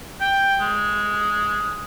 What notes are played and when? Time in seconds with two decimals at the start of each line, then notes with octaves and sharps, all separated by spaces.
0.21 G5
0.60 G#3